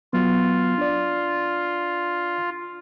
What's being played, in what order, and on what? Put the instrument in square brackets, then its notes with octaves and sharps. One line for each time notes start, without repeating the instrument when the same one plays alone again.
[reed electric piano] F#3 B3 [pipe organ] F4
[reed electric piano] D4 D5